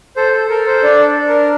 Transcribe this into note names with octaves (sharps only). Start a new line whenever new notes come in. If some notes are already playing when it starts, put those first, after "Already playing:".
A4 C5
A4
A4 A#4
C5
D4 D5
D4
A#4